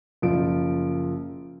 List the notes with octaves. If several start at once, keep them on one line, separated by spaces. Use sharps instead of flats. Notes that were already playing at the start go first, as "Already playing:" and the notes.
F#1 F3 F4 D7